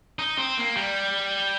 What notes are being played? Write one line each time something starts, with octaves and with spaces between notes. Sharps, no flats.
D#4
C4
A#3
G3